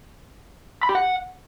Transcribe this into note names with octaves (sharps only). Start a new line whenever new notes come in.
B5
G4
F#5